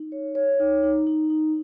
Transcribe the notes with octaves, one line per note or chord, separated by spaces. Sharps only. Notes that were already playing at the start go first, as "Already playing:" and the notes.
Already playing: D#4
C#5
C#5
D#4
D#4
D#4
D#4